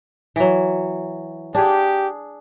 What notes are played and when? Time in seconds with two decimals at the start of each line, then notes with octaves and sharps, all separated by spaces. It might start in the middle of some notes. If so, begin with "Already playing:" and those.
0.36 E3 F#3
1.55 D4 G4 G#4